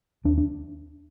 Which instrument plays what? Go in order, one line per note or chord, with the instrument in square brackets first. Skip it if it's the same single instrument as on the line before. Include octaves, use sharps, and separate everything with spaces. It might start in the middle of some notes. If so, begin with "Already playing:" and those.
[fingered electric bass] D#2 D4
D4